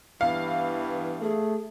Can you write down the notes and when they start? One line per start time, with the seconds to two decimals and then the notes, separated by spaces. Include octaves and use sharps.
0.21 G2 E3 B3 F5
1.21 A3 G#4